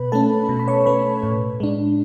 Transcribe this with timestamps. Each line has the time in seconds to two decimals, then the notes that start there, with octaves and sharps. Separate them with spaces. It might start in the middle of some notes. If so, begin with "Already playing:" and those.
Already playing: B2 B4 B5
0.12 A3 C#4 A4 A5
0.49 B2
0.60 B5
0.68 C#5 C#6
0.86 A3 C#4 B4 B5
1.23 A2
1.60 G#3 D4